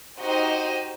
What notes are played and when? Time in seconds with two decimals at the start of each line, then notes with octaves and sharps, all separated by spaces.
0.18 D#4 F#4 G4 C5 D#5